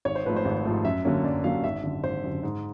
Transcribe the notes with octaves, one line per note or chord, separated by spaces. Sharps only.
G#1 C#5
C5
G#2 F3 A3 B4
C5
G#1
G#2 F3 A3
F#2 E5
D3 F#3 A#3 C#4
F#2 D5
D3 F#3 A#3 C#4 F5
G#1 E5
F#2 D3
G#1 C5
F#2 D3
G#2